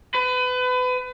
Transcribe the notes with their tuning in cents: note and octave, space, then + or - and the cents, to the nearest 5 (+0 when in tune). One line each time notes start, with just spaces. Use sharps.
B4 +30